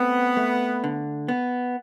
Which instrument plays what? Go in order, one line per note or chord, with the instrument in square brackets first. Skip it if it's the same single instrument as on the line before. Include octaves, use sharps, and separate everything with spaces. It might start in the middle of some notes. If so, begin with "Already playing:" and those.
Already playing: [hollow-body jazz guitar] A3 C4 [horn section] B3
[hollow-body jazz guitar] A3
D3
B3